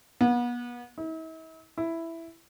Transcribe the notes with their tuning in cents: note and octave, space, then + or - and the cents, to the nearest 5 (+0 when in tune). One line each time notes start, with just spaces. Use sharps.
B3 -35
E4 -45
E4 +5